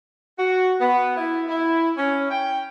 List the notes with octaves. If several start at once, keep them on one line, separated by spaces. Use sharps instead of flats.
F#4
B3
E4
E4
C#4
G5